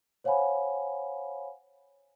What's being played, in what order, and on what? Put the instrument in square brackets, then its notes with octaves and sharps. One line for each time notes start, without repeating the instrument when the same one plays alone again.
[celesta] C5 C#5 F5 F#5 G#5 B5